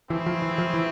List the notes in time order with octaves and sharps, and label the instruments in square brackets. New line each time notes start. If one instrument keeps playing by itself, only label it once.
[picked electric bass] E3 [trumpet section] A3 C4 E4 G#4
[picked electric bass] F3
E3
F3
E3